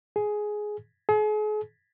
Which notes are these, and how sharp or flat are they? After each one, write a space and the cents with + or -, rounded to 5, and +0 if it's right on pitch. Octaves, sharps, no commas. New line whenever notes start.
G#4 +10
G#4 +40